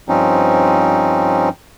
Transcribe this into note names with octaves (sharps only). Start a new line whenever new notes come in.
G2 F3 C4 C#4 D#4